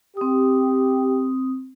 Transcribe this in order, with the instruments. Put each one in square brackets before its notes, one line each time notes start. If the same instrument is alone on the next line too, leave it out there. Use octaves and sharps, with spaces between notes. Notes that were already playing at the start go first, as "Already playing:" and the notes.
[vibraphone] C4 D#6 [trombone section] G4